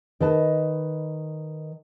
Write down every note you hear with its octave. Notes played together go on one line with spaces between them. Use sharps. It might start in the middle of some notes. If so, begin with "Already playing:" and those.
D#3 B4 D#5 A5